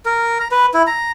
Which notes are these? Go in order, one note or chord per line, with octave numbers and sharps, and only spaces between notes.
A#4
A#5
B4
E4
A#5